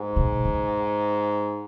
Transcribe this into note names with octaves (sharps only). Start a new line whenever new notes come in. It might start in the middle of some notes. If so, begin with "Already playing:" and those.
Already playing: G#2
B2
C#3